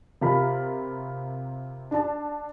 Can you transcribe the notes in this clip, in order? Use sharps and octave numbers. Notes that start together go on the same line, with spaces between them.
C3 F4 A#4 B5
D4 A5